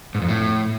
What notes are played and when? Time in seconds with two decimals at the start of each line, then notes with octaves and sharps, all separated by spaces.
0.15 G#2
0.22 F2
0.28 A2